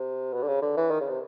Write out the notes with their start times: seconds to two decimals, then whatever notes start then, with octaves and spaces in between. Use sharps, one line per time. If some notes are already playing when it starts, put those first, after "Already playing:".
Already playing: C3
0.33 B2
0.42 D3
0.48 C#3
0.62 D3
0.77 E3
0.91 D#3
1.00 C#3
1.09 C3